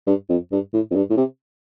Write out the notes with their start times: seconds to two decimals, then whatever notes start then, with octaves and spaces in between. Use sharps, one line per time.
0.07 G2
0.29 F2
0.52 G2
0.73 A2
0.91 F2
0.95 G2
1.10 A2
1.17 C3